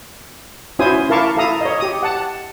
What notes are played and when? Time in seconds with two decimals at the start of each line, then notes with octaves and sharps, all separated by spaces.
0.79 C#4 E4 F#4 C5 G#5 D#6
1.09 E4 A#4 F5 A5 C#6 D6
1.36 E4 A4 F5 A#5 D#6
1.61 C#5 D#5
1.80 G4 D#6
2.03 F#5 A5